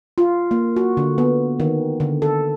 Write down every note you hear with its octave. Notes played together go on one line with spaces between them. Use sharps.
F4
A#3
F#4
D3
B3
D#3
D3
A4